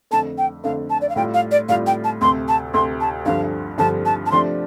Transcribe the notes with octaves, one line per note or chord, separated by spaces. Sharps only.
F2 D3 A3 A5
G5
F2 D3 A3 F5
A5
D5
F5
A2 G3 F4 G5
F5
D5
A2 G3 F4 F5
G5
A5
D2 C3 A3 C6
A5
D2 C3 A3 C6
A5
G2 D3 F3 F5
G2 D3 F3 A5
A5
A5
C3 F3 A3 D4 G4 C6